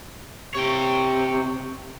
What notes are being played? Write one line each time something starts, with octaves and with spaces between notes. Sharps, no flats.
C3 C#5 G5